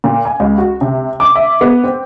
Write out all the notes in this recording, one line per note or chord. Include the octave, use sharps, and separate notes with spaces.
A#2
G#5
C#2
F#4
C3
D6
E5
B3
C4